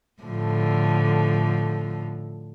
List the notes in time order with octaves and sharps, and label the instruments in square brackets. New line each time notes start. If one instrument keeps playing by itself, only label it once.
[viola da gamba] A2 D3 F3